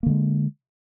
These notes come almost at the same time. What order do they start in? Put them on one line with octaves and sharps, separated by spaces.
A#3 D3 G#3